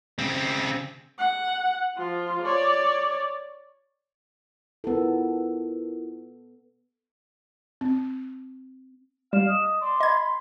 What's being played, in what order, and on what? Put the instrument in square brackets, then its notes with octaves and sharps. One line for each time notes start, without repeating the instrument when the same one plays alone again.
[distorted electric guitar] C#3 C4
[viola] F#5
F3 F4
C#5 D5
[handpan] B3 A4 [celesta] E4 F4 A#4
[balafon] C4
[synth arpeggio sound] G3 [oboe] F5 [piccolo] E7
[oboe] D#5
[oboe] D5 [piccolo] C6
[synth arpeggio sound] D#5 G#6 [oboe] B5